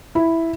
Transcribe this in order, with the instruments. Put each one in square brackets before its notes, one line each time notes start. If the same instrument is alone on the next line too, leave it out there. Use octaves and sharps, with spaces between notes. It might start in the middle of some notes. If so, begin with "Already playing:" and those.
[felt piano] E4